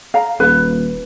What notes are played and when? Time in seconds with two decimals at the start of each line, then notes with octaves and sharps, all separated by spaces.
0.14 F5 A#5
0.40 D#1 B4